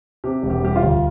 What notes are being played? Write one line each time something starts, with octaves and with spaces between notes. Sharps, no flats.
C3 G4
E1
G4
G3 G4
F4
D2